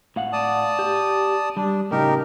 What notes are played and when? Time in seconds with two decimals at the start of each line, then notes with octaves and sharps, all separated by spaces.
0.16 A2 F5 F#5
0.33 D5 A5 D#6
0.79 G4
1.57 G3 D4
1.91 A2 C#3 D#4 G4 A#4